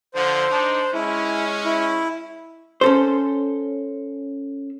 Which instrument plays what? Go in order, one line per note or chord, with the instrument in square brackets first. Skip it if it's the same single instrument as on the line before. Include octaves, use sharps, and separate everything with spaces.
[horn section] D3 F3 [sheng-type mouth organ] C5
[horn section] D4 D#4
[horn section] G#3 C#4 [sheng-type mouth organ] E4
[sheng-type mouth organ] E4
[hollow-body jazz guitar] C#4 A4 C5